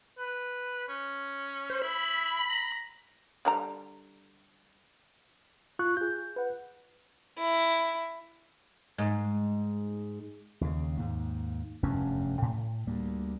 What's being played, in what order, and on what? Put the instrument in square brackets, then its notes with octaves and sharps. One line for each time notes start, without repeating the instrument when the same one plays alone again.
[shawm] B4
C#4
[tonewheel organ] C5
[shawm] E4 [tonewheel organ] B5
[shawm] A#5
[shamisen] D3 G3 A#5
[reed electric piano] F4 C#6 F#6
[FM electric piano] F4 G#4 [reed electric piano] G6
[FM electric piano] B4 F#5
[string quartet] E4
[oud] G#2
[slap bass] D#2 C#3
D#2 G#2
F1 E2 G2 C#4
A2
D2 G3 A#3